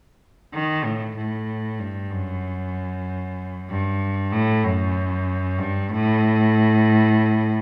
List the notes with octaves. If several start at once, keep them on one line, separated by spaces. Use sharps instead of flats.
D#3
A2
A2
G2
F#2
G2
A2
F#2
G2
A2